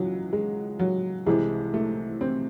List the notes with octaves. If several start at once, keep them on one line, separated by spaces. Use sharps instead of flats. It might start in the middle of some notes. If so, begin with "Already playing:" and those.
Already playing: C#2 E3 F#3
G#3
F#3
C2 C3 E3 G#3
A3
C4